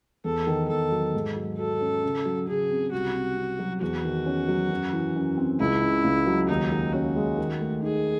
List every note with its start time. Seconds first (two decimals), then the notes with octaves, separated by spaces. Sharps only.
0.24 E2 A4
0.47 D#3
0.69 E2 A4
0.92 F#3
1.14 G#2
1.36 F#3
1.58 F#4 A4
1.81 C#4
2.03 C#3
2.25 F#3
2.47 C#3 G#4
2.70 C4
2.92 C2 F#4
3.14 C3
3.37 C4
3.59 F#3
3.82 E2 F#4
4.04 D#3
4.26 C#4
4.49 F#3
4.71 F#2
4.93 E3
5.16 F#2
5.38 C4
5.60 C#2 E4
5.82 C#3
6.04 C#2
6.27 F#3
6.49 D#2 D#4
6.71 D#3
6.93 C#4 F#4
7.16 G#3
7.38 D#3
7.60 A3
7.83 D#4 G#4